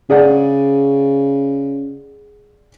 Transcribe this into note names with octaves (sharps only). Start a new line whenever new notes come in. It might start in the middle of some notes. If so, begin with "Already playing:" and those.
C#3 G#4 D5 F#5